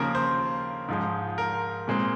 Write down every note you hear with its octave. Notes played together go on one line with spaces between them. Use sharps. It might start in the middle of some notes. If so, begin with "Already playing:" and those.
Already playing: D#2 C#3 F3 A#3 A#4
C5
G#2 F3 G#3
A#4
A#2 G#3 C4